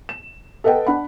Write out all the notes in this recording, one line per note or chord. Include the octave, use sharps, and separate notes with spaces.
E7
A4 B4 D#5 F#5 G5
D4 F#5 B5